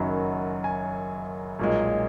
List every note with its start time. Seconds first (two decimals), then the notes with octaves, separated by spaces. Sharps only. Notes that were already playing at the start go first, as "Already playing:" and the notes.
Already playing: F#1 F#2 D#3 F#3 B5
0.64 G#5
1.59 B1 A#2 G#3